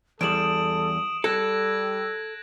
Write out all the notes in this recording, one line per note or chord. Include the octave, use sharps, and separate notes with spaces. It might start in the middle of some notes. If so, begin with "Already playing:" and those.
E2 G3 A4 D#6 D7 E7 F#7
G3 A4 E6 F#6 G#6 A#6